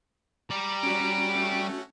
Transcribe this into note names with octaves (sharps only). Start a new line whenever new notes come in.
G3 D5 A#5
C#4 F#4 D7
A3